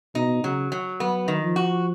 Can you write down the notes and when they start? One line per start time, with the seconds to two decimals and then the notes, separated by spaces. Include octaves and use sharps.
0.15 B2 D#4
0.43 C#3 F#3
0.72 F#3
1.00 F#3 B3
1.28 D#3
1.42 F3
1.56 F#4